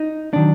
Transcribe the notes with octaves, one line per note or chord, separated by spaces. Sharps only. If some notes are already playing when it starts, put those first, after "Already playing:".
Already playing: D#4
D#3 F#3 D4